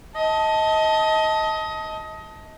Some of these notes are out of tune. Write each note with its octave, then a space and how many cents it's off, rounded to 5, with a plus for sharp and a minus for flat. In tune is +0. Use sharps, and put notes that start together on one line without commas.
D#5 +25 A5 +0